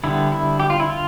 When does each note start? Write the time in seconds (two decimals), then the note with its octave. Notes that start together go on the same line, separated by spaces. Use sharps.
0.04 D3 G3 B3 E4
0.32 E4
0.60 G4
0.70 F4
0.80 E4
0.90 F4